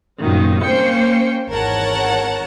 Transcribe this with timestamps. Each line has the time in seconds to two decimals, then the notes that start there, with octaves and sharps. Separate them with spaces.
0.21 C2 F#2 A#2 D#3 F#3
0.65 A#3 C#4 C5 G5 C#7
1.49 G#1 E2 A#4 C#5 F#5 A5